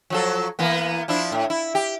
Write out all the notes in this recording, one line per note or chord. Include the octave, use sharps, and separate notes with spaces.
F3 F#3 A4
E3 A#3 B3
F3 D4 E4
A2
E4
G4